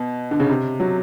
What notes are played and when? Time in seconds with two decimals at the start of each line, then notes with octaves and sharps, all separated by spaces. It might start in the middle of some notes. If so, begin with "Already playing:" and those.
Already playing: B2
0.31 D3
0.40 C#3
0.49 C3
0.80 F#3